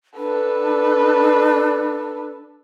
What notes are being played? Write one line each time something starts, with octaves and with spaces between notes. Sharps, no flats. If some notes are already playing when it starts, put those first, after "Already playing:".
D4 A4 B4